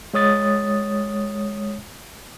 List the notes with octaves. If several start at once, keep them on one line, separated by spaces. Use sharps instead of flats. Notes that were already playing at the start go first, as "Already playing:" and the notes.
G#3 C#5 D#6 A6